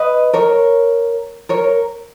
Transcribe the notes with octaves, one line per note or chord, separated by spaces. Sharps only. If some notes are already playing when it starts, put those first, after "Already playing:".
Already playing: B4 D#5
A#4 C#5
A#4 C#5